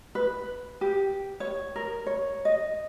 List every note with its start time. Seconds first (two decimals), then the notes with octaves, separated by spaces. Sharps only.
0.15 B4
0.81 G4
1.40 C#5
1.76 A#4
2.06 C#5
2.45 D#5